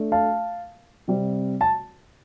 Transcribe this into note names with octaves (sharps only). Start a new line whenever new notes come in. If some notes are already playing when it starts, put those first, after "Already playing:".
Already playing: A3 D4
F5 A5
C3 G3 C4
A5